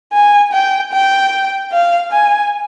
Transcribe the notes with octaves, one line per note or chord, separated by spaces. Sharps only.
G#5
G5
G5
F5
G#5